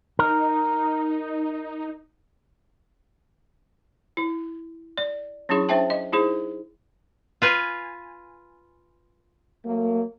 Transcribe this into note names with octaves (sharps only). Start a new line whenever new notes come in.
D#4 A#4
E4
D5
F#3 C#4 D4 E4 G#4 C#6
C#4 D4 C5 E5 G5 A5
D#5
D#4 E4 G#4 C5
F4 B4 G#5
F#3 A3 A#3